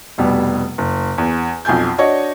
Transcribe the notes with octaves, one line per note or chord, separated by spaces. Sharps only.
F1 B2 G3 B3
F#1
E2
B1 F2 F4 G#5 G6
D4 F#4 C#5 D#5